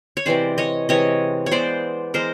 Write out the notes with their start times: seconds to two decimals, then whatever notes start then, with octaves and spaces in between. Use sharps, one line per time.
0.17 C#5
0.25 C3 E3 G#3 C5 D5
0.58 C#5 D#5
0.89 C3 E3 G#3 C#5 D#5
1.46 C#5
1.51 E3 G#3 B3 C5 D5
2.14 E3 G#3 B3 A#4 C5